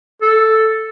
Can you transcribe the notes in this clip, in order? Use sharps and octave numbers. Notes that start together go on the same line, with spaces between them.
A4